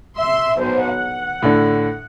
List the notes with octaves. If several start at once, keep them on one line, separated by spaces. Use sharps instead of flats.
E5 C6
B1 C5
F#5
A2 D3